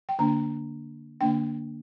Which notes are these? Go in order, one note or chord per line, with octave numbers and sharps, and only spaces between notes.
G5
D3 A#3 D4 A#5
D3 A#3 D4 G5